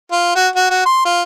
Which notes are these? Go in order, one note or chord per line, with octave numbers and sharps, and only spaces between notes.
F4
F#4
F#4
F#4
C6
F4